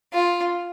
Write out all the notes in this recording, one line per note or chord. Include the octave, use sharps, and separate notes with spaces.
F4